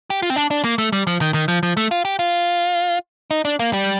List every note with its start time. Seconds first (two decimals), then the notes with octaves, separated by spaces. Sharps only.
0.10 G4
0.22 F4
0.30 C4
0.36 D4
0.51 D4
0.64 A#3
0.78 A3
0.93 G3
1.07 F3
1.21 D#3
1.34 D#3
1.48 F3
1.63 F3
1.77 A3
1.91 F4
2.05 G4
2.19 F4
3.31 D#4
3.45 D4
3.59 A#3
3.73 G3